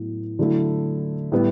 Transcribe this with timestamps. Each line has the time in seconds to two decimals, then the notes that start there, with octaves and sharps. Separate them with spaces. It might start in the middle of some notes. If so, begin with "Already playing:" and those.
Already playing: A2 F#3 B3
0.39 D3 F#3 A3 E4
1.32 A2 G3 B3 E4